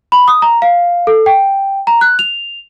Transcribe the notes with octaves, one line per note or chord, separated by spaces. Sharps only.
B5
D#6
A#5
F5
A4
G5
A#5
F#6
F7